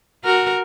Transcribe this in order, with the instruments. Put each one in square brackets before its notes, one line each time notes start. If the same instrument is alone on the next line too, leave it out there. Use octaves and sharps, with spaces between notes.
[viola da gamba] F#4 A#4